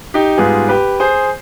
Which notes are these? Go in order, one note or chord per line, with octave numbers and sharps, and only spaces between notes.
D#4 G4
G#2 G3 B3 F4 G#4
G4 B4
G#4 C5